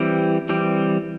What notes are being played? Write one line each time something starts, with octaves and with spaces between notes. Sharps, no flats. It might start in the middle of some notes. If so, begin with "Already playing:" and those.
Already playing: E3 G3 C4 G4
E3 G3 C4 G4